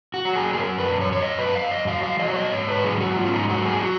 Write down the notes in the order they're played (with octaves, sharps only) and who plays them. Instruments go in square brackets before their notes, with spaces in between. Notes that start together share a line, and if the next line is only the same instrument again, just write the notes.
[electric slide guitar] F#4
F#3
G#4
G#4
F#2 A#4
B4
F#2
C#5
C#5
F#2 D#5
B4
F#2 F5
D#5
F#3 F5
F5
F#3 D#5
C#5
D#5
G#2 C#5
B4
F#3 G#4
F#4
G#2 F4
C#4
D#4
F#3 F#4
G#4
F#4